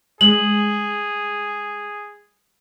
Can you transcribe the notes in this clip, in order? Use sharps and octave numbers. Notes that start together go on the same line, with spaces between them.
G#3 G#4 F#7